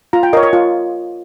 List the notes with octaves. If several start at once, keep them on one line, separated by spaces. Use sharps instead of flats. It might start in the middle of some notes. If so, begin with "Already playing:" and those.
F4 A#5
G5
A#4 C#5 D#5
C#5
F4